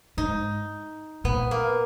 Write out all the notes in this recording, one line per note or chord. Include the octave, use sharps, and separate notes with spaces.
G#2 D#4
A#2 B3
A#3